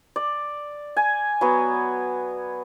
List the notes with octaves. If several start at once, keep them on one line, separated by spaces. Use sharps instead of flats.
D5
G#5
F#3 B3